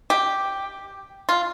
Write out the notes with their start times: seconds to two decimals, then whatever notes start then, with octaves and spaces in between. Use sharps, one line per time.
0.10 G4
1.29 F4